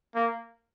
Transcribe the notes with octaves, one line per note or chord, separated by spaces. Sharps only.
A#3